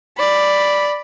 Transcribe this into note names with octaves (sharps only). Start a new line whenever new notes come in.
D5 B5